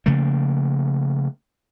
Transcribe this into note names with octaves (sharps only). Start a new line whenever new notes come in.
C#3 F3 A3 A#3